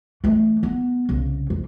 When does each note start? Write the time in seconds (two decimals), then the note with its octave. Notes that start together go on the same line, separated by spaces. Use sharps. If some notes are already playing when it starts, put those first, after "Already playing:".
0.24 E3 A3
0.63 B3
1.09 C2 C#3
1.50 F2